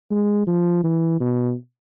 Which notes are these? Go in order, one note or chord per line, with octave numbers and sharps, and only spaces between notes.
G#3
F3
E3
B2